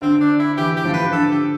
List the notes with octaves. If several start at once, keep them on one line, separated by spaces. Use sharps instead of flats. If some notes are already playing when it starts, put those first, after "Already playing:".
D3 C4
D4
E4
E3 G4
G4
F3
B4
D3 A4
G4